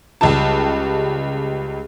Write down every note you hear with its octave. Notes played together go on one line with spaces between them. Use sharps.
C#2 G3 G4 A5